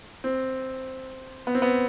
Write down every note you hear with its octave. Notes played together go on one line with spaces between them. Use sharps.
C4
B3
C4
B3